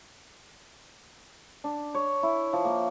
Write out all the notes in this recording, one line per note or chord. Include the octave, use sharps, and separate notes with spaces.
D4
C#5
E4
F3
A#3